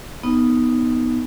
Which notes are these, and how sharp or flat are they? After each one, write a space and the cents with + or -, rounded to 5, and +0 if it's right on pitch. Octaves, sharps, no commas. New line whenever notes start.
B3 +0 D#4 +0